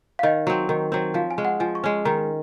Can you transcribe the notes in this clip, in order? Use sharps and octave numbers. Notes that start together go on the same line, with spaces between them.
F5
D#3 D#5
F#3 C4
D#3
F#3 C4
F3 F5
G#5
G#3 C#4
F#5
F3 G#5
C#6
G#3 C#4
D#3 A#5